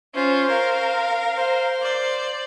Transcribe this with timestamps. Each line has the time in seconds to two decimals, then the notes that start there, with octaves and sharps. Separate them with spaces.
0.15 C#4 F4 C5
0.50 A#4 F5
1.37 C5
1.83 D5